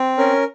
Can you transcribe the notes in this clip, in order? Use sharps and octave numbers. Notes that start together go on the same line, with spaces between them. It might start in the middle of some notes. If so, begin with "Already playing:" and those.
Already playing: C4
C#4 A#4